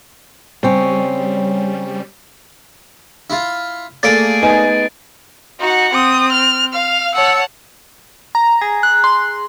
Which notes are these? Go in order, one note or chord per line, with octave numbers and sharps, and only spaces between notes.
C#3 G3 C4 C#4
E4 F4
A3 A#3 G#4 A4 D5 A6 D7
B3 D#4 G#5
D#4 F#4 F#5
C4 D#6
F6
F5 F6
C#5 F#5 A5 E6
A#5
G#4
F#6
C6